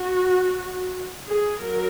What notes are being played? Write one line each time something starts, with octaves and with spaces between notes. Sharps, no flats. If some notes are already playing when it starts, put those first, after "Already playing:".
Already playing: F#4
G#4
F#3 A#4